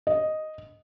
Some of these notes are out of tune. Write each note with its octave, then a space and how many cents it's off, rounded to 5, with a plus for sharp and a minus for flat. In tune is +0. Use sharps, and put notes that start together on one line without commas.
D#5 +0